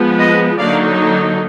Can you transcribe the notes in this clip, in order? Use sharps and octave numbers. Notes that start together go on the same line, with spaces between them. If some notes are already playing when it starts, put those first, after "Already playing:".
Already playing: F3 G#3 B3
B4 D#5
D3 F#3 A#3 D#4 D5 F5